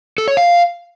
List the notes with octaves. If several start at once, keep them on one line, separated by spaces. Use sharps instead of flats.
A4
C#5
F5